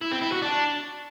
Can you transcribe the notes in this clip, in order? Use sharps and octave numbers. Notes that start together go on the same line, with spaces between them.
E4
C4
E4
F#4
D4